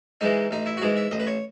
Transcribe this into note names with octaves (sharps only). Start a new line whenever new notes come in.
G#2 E3 G#3 D#4
A1 D#4
E4
F#4
G#2 E3 G#3 G#4
E5
A1 D#5
B4
C#5